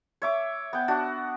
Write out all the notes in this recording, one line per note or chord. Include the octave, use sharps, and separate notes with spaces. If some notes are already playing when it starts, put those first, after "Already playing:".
C#5 E5 D6
B3 G5
D4 F#4